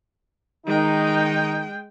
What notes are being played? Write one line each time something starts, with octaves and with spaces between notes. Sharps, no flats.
D#3 G#3 D#4 G5